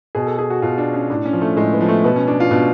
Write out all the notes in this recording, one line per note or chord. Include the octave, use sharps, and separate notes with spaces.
B2 G#4
A4
G#4
F#4
B2 F4
D4
C#4
A2 D4
C#4
F3
A3
A2 G#3
B3
F3
A3
B2 B3
C#4
D4
F4
B2 D4